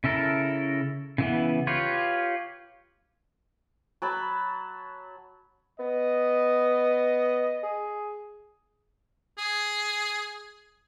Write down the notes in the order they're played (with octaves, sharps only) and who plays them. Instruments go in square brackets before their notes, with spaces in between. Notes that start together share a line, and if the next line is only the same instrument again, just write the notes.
[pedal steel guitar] C#3 E4 A4 A#4
C#3 E3 B3
F4 G4 B4 C#5
[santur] F#3 A5 B5
[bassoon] B3 [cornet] D#5
[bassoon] G#4
[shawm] G#4